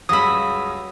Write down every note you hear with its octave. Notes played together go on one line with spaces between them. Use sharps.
C#2 G2 C#3 F#3 B5 D#6 E6